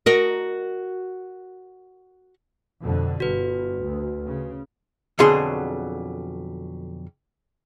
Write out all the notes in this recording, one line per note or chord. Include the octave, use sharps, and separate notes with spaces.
F#4 A#4 D#5
F2 B2 D3
G1 F#4 B4
D2
C#3
F2 B2 D3 F#3 G#4 C6